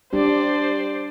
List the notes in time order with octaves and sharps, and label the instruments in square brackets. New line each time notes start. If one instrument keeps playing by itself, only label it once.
[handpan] G3 D4 G4 [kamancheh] C5 D5